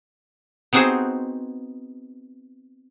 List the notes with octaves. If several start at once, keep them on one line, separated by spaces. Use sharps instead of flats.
B3 C4 D#4 F#4 G#4 C5